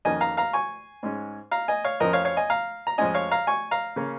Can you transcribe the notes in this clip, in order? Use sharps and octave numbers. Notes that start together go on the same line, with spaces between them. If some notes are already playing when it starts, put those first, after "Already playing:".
F2 D#3 A#3 C#4 D#5 G#5
F5 A#5
F5 A#5
G#5 C#6
G#2 G#3 C#4
F5 A#5
D#5 G#5
C#5 F5
F2 F3 C#4 A#4 D#5
C#5 F5
C#5 F5
D#5 G#5
F5 A#5
A#5
F2 F3 G#3 C#4 D#5 G#5
C#5 F5
F5 A#5
G#5 C#6
F5 A#5
C#3 A#3 C#4